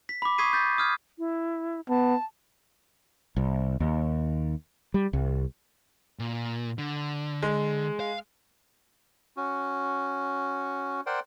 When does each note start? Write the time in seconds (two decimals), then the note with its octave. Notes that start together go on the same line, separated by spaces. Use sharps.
0.09 B6
0.22 B5 D6
0.38 C#6 D#6 G#6 B6 C7 D#7
0.53 G6 A6 B6
0.78 D#6 F6 G#6
1.19 E4
1.89 B3 A5
3.37 C2
3.80 D#2
4.94 G3
5.13 C2
6.19 A#2
6.78 D3
7.43 G#3
8.00 F5
9.37 C#4 F#4
11.06 A#4 C5 D5 F#5 G5 C6